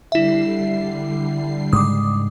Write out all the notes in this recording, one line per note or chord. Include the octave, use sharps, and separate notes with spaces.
D3 G3 E4 E5 C7
G#2 C#3 G#3 D6 D#6